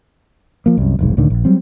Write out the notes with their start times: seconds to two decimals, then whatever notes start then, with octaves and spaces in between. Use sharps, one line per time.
0.66 F3 A#3
0.77 C2 F#2
0.99 F1 B1 G#2
1.17 C#2 A2 D3 D#3
1.30 A#1
1.45 F#3 G3 C4